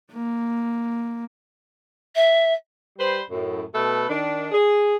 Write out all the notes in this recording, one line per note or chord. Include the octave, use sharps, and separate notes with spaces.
A#3
E5
G3 B4 C5
F#2 A2
B2 A3 A4 B4
D#3 D4
G#4